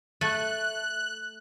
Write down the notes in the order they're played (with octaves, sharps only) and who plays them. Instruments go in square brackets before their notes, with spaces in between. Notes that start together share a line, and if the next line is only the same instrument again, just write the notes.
[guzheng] A3 [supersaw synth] F#6